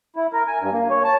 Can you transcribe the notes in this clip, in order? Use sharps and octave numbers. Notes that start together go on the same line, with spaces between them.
E4
A#4
G#5
G2
A#3
C#5
A5